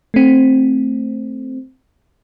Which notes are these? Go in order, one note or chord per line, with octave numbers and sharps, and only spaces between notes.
A3 C4